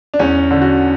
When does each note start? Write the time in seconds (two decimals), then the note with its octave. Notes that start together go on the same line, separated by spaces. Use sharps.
0.14 D4
0.19 E2 C#4
0.51 D3
0.62 F#4